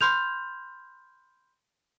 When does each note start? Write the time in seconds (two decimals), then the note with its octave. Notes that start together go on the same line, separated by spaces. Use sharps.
0.01 B5 C6 F6 G6 F7